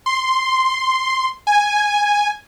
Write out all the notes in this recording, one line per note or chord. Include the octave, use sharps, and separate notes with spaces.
C6
G#5